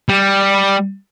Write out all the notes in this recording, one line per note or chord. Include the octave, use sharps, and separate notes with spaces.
G3